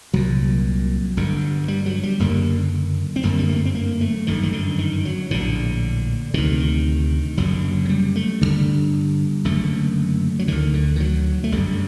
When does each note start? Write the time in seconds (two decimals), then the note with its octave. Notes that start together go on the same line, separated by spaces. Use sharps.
0.13 C2 A#2 F#3
1.17 G1 G2 D3
1.68 G3
1.86 F#3
2.03 G3
2.19 F#1 F#2 D3 A#3
3.16 C4
3.23 G1 F#2 D3 A#3
3.39 G3
3.49 A3
3.65 C4
3.75 A#3
4.01 A3
4.27 G1 F#2 D3 D#3
4.43 D#3
4.52 D3
4.78 D#3
5.05 F#3
5.31 A#1 A2 D3
6.34 D2 C3 D#3
6.60 D#3
7.37 F#1 F#2 D3 F#3
7.85 F#3
7.89 G3
8.16 A3
8.41 G1 F#2 D3 G3
9.44 F#1 F#2 D3 A3
10.39 F#3
10.48 D2 D3 D#3
10.74 D3
10.96 D#3
11.00 F#3
11.44 A3
11.52 G1 F#2 D3 G3